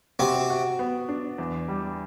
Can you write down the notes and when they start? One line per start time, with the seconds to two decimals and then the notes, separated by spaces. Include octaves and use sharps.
0.19 C3 C4 F#4
0.50 F#4
0.79 B3
1.09 D4
1.38 E2
1.68 G3